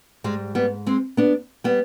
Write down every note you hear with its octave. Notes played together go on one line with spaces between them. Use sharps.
G#2 G3 G#3
G3 B3
G#3 C4
B3 D4
G3 B3